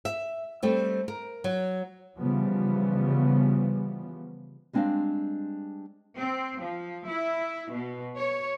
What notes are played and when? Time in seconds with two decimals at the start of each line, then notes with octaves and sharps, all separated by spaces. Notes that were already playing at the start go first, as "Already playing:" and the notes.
0.05 E5
0.63 G3 A3 C4
1.08 A#4
1.44 F#3
2.19 C#3 E3 F3 G3 B3
4.73 G3 G#3 C4 D4 D#5 F5
6.17 C4
6.62 F3
7.06 E4
7.72 B2
8.18 C#5